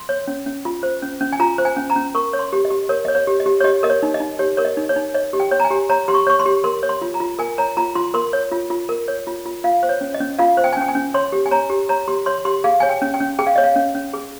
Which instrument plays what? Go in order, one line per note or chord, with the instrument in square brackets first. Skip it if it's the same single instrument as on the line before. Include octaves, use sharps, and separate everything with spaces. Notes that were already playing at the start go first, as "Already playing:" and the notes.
Already playing: [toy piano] C6
C#5
C#4
C#4
F4
C5
C#4
C#4
G#5
F4 A#5
C5
G#5
C#4
A#5
C#4
A#4 C#6
C#5
C6
G4
D#5
G4
A#4 C#5
C#5 D#5
C#5
G4
D#5
G4
C#5
G4 D#5
A#4 D#5
C#5
D#4
D#5
D#4
G4 C#5
A#4 C#5
D#5
D#4
C#5
D#4
C#5 D#5
G4
G5
C#5
A#5
G#5
G4
C#5 A#5
G4 C6
C#6
C#5 C#6
C6
G4
A#4 C6
C#5
C6
F4
A#5
F4
A#4 G#5
C#5 A#5
F4 A#5
F4 C6
A#4 C6
C#5
F4
F4
A#4
C#5
F4
F4
F4 F5
C5
C#5
C#4
D#5
C#4
F4 F5
C5
G5
G#5
C#4 G5
G#5
C#4
C#5 C6
G4
G#5
C#5 A#5
G4
C#5 A#5
G4 C6
C#5 C6
G4 C6
G#4 F5
C#5 G#5
G5
C#4
G5
C#4
G#4 G5
F5
C#5 D#5
F5
C#4
C#4
G#4